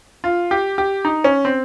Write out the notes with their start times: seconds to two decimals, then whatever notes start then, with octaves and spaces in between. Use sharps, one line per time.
0.24 F4
0.51 G4
0.78 G4
1.05 D#4
1.24 C#4
1.45 C4